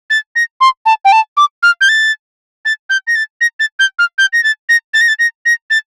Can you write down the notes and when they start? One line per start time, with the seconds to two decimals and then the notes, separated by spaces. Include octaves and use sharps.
0.10 A6
0.36 A#6
0.61 C6
0.86 A5
1.05 G5
1.12 A5
1.37 D6
1.63 F6
1.81 G6
1.89 A6
2.65 A6
2.90 G6
3.07 A#6
3.15 A6
3.41 A#6
3.60 A6
3.79 G6
3.99 F6
4.18 G6
4.33 A#6
4.44 A6
4.69 A#6
4.94 A6
5.01 A#6
5.08 A6
5.19 A#6
5.45 A#6
5.70 A6